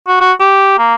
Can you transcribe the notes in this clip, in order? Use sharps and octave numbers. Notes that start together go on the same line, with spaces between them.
F#4
F#4
G4
A#3